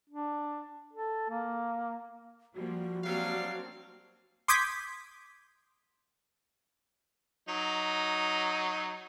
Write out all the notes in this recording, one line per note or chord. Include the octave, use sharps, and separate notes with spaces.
D4
A4
A#3
F3 G3 A#3 F#4
F#3 G3 A#3 C4 D4 F5
C6 D6 D#6 G6 G#6 B6
F#3 D#4